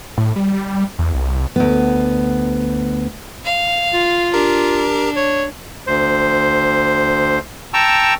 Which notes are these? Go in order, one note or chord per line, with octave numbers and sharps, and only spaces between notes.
A2
G3
G3
E2
C2
D2 B3
F5
F4
D4 G4 A#4 A#5
C#5
D2 C5
G5 A5 A#5 C#6 E6